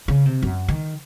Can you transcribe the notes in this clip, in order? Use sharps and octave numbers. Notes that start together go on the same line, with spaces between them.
C#3
C3
F#2
D#3